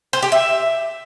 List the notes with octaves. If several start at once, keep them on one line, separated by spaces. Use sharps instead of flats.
C5
G4
E5